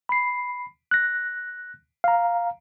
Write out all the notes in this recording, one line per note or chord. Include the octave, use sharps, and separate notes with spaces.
B5 C7
F#6 A#6
F5 A#5